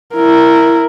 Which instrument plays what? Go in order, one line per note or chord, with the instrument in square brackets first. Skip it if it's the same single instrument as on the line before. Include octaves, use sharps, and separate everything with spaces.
[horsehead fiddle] E4 A#4